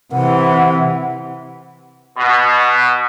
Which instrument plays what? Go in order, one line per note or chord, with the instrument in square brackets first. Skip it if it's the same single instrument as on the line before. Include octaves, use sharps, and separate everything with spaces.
[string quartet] C3 E3 [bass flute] F#5
[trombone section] B2